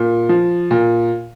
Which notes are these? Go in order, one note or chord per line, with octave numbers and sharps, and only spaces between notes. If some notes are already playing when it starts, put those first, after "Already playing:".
Already playing: A#2
F3
A#2